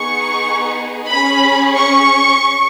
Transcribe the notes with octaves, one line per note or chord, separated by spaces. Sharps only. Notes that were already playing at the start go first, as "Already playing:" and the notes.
Already playing: B3 D#4 G#4 C#6
C#4 G#4 B5
C#6